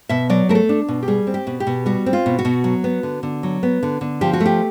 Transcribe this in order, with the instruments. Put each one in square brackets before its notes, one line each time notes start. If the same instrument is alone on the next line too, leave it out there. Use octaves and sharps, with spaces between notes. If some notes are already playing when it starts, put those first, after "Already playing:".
[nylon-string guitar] B2 E5
F#3 D5
A3 A#4
A4
D4
B2
G4
G3 G#4
C4
G4
B2
G4
B2
G3 F#4
C4
F4
B2
F#4
B2
F#3
B3
D3
D3
F#3
B3
D3
D3
F3 G4
F#4
A3
G4